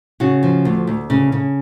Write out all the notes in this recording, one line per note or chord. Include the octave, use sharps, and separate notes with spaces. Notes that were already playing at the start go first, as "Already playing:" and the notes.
C#3 F#4
F3
D2
D2
C#3
C#3